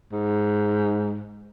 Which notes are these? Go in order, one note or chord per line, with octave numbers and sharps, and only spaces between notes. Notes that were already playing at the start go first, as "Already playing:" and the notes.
G#2